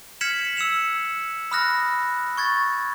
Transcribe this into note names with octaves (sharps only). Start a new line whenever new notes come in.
F6 G#6 B6 C#7 E7 F#7
E6 C#7 E7 F7
B5 D#6 F6 F#6 A#6
C#6 G#6 A6